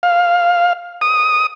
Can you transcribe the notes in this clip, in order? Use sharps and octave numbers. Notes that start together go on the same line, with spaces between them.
F5
D#6